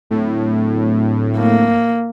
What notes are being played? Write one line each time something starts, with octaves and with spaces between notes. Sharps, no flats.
D1 A2
A#3